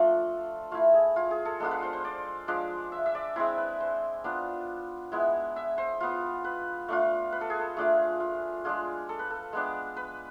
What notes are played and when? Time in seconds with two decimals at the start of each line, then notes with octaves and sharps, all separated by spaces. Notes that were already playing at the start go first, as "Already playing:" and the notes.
Already playing: F3 A3 D4 F4 A4
0.71 A3 E4 F4
0.94 G#4
1.16 F4
1.31 G#4
1.45 A4
1.60 G#3 B3 D4 F4 A4
1.71 B4
1.83 C5
1.93 C5
2.04 D5
2.48 F3 G#3 D4
2.92 E5
3.06 E5
3.15 D5
3.36 G#3 C4 E4 C5
3.58 B4
3.80 C5
4.24 B3 D4 F4
5.12 G#3 B3 E4
5.56 E5
5.78 C5
6.00 B3 F4
6.44 B4
6.88 A3 D4 F4
7.32 B4
7.41 A4
7.50 G#4
7.60 A4
7.76 A3 D4 F4 G#4
8.20 F4
8.65 G#3 D4 F4 G#4
9.09 A4
9.19 B4
9.30 A4
9.53 G#3 B3 D4
9.97 B4